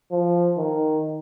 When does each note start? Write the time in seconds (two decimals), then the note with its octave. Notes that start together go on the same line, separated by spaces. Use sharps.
0.11 F3
0.57 D#3